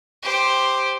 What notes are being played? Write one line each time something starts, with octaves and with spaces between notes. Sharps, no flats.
G4 C5